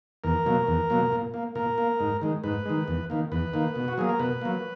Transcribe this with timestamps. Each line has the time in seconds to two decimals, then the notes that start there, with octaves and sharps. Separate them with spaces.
0.24 E2 A#4
0.46 B2 F#3 A#3
0.67 E2
0.90 B2 F#3 A#3
1.12 A#2
1.34 A#3
1.55 A#2 A#4
1.78 A#3
2.00 G#2
2.22 D#3 G#3
2.44 G#2 B4
2.66 D#3 G#3
2.88 E2
3.10 D#3 A#3
3.32 E2 B4
3.54 D#3 A#3
3.76 B2
3.88 F#4
3.98 F#3 A#3 G#4
4.09 A#4
4.19 B2 B4
4.41 F#3 A#3